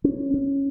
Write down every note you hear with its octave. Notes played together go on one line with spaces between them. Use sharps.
C#4
C#4